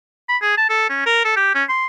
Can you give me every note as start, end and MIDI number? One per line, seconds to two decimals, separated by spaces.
0.29 0.37 83
0.42 0.55 68
0.57 0.65 81
0.69 0.88 69
0.90 1.04 61
1.06 1.20 70
1.24 1.36 69
1.36 1.52 67
1.55 1.64 61
1.69 1.87 84